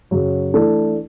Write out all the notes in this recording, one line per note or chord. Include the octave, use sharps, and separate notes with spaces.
F#2 C#3 F#3
E3 A3 D4 A4